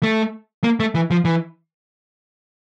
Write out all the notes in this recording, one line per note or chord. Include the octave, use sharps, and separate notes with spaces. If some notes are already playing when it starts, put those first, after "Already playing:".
A3
A#3
A3
E3
F3
E3